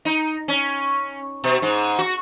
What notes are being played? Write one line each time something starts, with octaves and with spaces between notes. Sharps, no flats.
D#4
C#4
B2
G#2
F#4